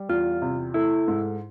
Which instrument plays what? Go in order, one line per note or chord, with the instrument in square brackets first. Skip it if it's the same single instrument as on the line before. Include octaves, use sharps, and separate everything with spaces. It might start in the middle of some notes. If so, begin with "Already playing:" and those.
Already playing: [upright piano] G3
[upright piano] E2 [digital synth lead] F4
[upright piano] C3
[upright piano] A3 [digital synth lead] E4
[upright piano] G#2